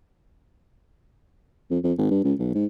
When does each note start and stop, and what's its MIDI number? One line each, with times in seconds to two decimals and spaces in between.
1.70 1.79 41
1.84 1.93 41
1.98 2.07 32
2.11 2.21 43
2.24 2.34 37
2.39 2.54 35
2.55 2.65 44